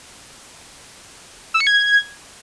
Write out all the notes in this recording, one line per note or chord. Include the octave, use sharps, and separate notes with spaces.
E6
C#7
G#6